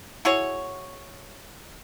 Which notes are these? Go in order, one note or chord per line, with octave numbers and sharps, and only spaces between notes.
E4 F#4 G#4 C#5